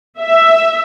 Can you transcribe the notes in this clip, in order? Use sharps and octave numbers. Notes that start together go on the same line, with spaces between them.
E5